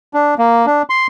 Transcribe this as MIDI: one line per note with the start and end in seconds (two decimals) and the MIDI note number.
0.14 0.35 62
0.38 0.66 58
0.66 0.82 62
0.90 1.07 84